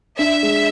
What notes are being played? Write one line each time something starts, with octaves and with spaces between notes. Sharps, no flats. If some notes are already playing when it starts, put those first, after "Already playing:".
D4 E5
G#3